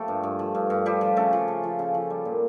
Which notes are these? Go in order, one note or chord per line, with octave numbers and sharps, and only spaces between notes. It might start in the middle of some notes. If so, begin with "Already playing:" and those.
Already playing: F3 A3 G4 A4
G2
G2
F3
G2
G2
F3 G3 G4
F3
C#3 A3 A4
F3
C#3
F3
C#3
F3
G3
A#2